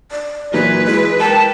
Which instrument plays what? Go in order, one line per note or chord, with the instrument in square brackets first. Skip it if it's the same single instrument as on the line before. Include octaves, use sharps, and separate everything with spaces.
[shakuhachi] D5
[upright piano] A#2 E3 F#3 [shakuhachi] D#4 [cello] B4
[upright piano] G#3 [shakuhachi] E4
[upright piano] A#4 [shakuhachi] G5 [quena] A5